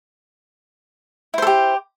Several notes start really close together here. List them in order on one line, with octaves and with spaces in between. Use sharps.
E4 C5 A4 G4